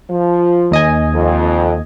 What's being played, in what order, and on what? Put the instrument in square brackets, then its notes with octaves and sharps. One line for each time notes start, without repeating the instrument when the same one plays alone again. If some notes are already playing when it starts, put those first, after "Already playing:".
[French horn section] F3
[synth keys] D#2 D#5 G#5
[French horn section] F2